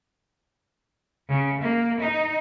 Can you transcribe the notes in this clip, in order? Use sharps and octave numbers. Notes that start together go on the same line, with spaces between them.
C#3
A#3
D#4